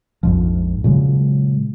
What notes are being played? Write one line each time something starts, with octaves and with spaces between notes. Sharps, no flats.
A#1 F2 G#2 F3
A#2 C#3 F#3 G#3